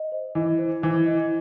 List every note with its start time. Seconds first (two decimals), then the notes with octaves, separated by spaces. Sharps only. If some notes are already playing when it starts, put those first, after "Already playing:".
Already playing: D#5
0.12 C5
0.35 E3 D#5
0.59 C5
0.82 E3 C5
1.06 D#5